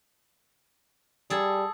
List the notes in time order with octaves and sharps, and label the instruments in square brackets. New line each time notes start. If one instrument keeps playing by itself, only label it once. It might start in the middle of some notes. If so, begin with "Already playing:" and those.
[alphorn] G3 [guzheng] G#4 A4